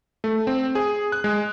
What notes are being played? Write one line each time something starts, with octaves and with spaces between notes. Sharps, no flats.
A3
C4
G#4
F#6
G#3